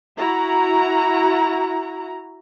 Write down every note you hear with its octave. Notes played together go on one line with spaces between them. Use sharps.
E4 F#4 A#5